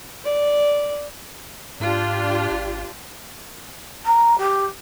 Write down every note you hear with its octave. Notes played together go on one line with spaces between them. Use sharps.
D5
G#2 D4 F4 G4
G#1
A#5
G4